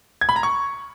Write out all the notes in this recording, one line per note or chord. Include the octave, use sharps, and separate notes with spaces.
G#6
B5
A#5
C#6